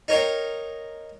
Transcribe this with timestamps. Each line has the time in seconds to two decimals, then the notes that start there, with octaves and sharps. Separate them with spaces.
0.08 D#4 A#4 C#5 F5 G5